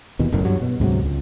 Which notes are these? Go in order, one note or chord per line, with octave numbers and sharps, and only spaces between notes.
D#2 B2 E3
F#1 B1 F#2 A2
G2 F#3
B2
D2 G#2 C3 F#3
C#2